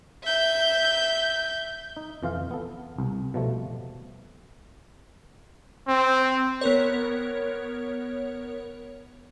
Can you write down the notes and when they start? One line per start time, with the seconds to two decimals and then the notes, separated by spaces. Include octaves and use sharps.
0.24 E5 G6
1.97 D#4
2.23 F2 E3 F4 F5
2.51 B3 A4
2.98 C2
3.34 B2 F3 G3 A3
5.88 C4
6.61 B3 A#4 C#5